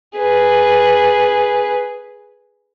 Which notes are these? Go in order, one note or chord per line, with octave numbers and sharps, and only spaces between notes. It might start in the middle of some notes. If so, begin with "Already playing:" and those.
G#4 B4